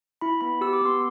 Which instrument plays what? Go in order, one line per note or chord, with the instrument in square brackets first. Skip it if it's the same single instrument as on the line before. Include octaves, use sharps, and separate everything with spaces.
[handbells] E4 B5
B3 B5
G4 E6
D6
B3 C6